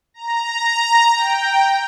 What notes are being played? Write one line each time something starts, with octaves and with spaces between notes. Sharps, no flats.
A#5
G5